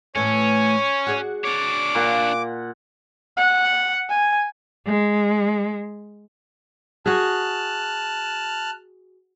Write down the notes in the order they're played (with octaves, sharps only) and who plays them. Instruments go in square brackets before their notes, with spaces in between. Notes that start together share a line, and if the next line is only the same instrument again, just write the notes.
[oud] A2 E3 A3 [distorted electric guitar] C#4 [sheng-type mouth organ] C#5 G#5
[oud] F#4 G#4 D5
[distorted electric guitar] D4 C#5 [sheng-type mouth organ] D6
[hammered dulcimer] A#2 F#5
[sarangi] F#5
G#5
[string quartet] G#3
[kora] F#4 G#4 [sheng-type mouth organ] A5 F6 F#6